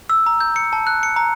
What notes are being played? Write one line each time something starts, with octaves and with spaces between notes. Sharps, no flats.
E6
A#5
G6
C#7
A5
F#6
C#7
A#5